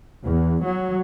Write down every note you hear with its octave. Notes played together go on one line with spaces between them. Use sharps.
E2
F#3